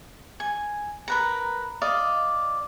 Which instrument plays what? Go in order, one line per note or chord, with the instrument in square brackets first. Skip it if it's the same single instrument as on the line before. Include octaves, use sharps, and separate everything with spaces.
[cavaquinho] G#5
A#4 B4 A#5
D5 D#5 F5